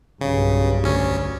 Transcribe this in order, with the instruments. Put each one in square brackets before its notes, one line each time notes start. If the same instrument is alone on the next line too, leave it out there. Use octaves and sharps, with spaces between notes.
[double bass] B1 G2 [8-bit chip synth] C#3
[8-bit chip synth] D2 C#4